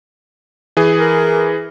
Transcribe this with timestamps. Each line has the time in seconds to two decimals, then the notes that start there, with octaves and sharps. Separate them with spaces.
0.77 E3 G#4
0.99 A#4